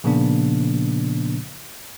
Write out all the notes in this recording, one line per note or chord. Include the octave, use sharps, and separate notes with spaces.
A#2 C#3 F3 A#3 B3 D4